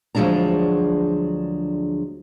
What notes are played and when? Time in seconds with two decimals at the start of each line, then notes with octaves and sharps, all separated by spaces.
0.15 D2 F3 F#3 G#3 D4 A#5